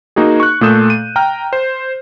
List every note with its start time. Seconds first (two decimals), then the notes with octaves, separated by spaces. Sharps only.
0.16 A#3 D#4 F#4 G#4
0.40 C#6 F#6
0.61 A#2 A3 A4 D#6 G6 E7
0.90 D#7
1.16 G5 A#5 F6
1.53 C5